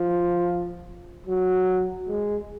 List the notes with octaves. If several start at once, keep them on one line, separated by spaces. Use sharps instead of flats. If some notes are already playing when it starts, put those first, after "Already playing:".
Already playing: F3
F#3
G#3